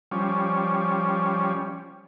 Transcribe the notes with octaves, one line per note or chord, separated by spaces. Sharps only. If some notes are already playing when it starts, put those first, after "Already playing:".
F3 G3 C#4